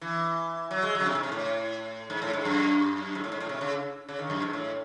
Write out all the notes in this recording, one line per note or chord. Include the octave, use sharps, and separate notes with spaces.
E3
F#3
G#3
F#3
C#3
C3
G#2
C3
A2
G#2
A2
G#2
F#2
G#2
A2
G#2
A2
C3
C#3
C#3
D#3
F#2
G#2
A2